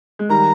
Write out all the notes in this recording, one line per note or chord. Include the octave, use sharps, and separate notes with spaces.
G#3
D#3 G3 A#5